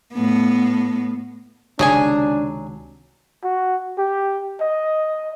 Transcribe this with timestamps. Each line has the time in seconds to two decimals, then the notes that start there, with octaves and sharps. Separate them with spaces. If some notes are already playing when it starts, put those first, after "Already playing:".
0.14 A2 B3
1.79 C#2 C3 D#3 F#3 D4 G#4 G#5
3.44 F#4
3.98 G4
4.61 D#5